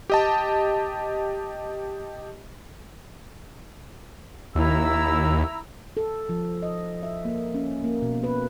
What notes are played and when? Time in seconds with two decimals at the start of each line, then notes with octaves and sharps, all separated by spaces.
0.10 G4 D#5 A5
4.55 D#2 E4 A#5 E6
5.97 A4
6.29 F3
6.63 D#5
7.03 E5
7.25 A#3
7.54 C#4
7.84 A#3
8.02 B2
8.24 B4